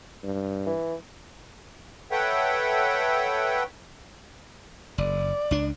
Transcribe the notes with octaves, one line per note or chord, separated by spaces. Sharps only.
G2
E3
A4 B4 C#5 E5 F#5 G5
F#1 D5
C#2 D4